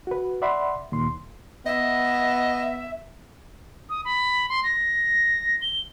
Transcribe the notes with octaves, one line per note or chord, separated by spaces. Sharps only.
F#4 B4
D5 E5 F#5 B5 C6
D#2 A#2 C6
B3 D#5 E5
D#6
B5
C6
A#6
G7